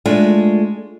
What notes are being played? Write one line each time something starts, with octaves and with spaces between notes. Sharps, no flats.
G#3 A3 D4 F4